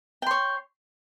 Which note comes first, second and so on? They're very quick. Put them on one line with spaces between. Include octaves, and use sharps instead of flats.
G5 C6 C#5